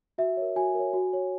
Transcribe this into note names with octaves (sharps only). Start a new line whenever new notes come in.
F#4 E5
A#4 C#5
F#4 G#5
A#4 C#5
F#4
C#5